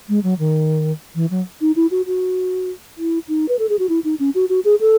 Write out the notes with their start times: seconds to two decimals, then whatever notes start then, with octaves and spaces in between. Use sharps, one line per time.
0.09 G#3
0.23 F#3
0.39 D#3
1.15 E3
1.30 F#3
1.61 D#4
1.76 E4
1.91 F#4
2.06 F#4
2.97 E4
3.28 D#4
3.49 B4
3.59 A4
3.69 G#4
3.79 F#4
3.89 E4
4.04 D#4
4.19 C#4
4.35 F#4
4.49 F#4
4.65 G#4
4.80 A4